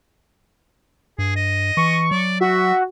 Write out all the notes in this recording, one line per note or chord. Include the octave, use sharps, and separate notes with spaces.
G2 G#4
D#5
E3 C#6
F#3 D5
F#4 E5